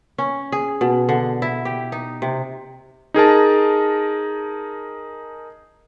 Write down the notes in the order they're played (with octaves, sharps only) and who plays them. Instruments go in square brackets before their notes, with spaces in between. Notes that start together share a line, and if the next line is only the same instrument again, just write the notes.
[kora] C#4
G#4
B2
D3
E4
G4
D#4
C3
[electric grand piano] D#4 G#4 A#4 A5